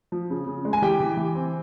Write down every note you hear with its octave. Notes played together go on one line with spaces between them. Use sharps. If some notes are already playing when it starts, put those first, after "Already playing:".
F3
C#3
C#3
G#3
G#5
E3 G4 G5
E3
E3
C4